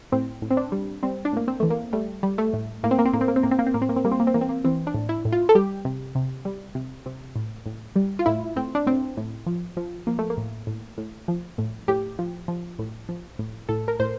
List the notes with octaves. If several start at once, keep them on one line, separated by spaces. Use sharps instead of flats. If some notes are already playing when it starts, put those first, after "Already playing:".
A2 C4
A2
C4
D4
G3
G3 C4
D4
A2 A#3
C4
E3 A3
A#3
G3 A3
G3
A3
A2
A2 A#3
C4
A#3
C4
A2 A#3
C4
A#3
C4
A2 A#3
C4
A#3
C4
A2 A#3
C4
A#3
C4
G3 A#3
C4
A#3
C4
E3 A#3
C4
A#3
E3 C4
D4
A2
E4
A2
F4
A4
G3 G4
C3
C3
G3
C3
C3
A2
A2
G3
F4
A2 E4
A2 C4
D4
A2 C4
A2
F3
F3
F3 A#3
A3
A#3
A2
A2
A2
F3
A2
A2 G4
F3
F3
A2
F3
A2
A2 A4
A#4
A2 C5